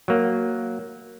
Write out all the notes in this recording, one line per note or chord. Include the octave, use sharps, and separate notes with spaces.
F#3 A#3